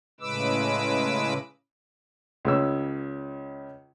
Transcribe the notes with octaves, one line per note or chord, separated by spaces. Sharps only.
A2 C#3 G#3 B4 D6 E6
C#2 C#3 E6